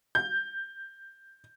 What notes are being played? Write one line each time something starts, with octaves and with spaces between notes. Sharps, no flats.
G6